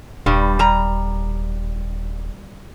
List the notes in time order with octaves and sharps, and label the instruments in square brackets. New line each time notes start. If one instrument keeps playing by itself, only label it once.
[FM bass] D#1 [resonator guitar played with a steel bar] G2 G3
[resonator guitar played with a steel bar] G3 A#5